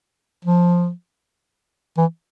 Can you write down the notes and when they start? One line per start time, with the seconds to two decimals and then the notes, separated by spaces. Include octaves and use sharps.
0.45 F3
1.97 E3